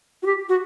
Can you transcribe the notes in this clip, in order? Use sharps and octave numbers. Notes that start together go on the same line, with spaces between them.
F#4
G4
F#4